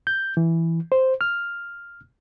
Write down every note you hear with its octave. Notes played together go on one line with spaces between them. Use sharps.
G6
E3
C5
F6